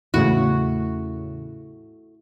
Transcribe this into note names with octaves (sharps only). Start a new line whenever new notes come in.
E2 A2 C#3 A3 E4 F#4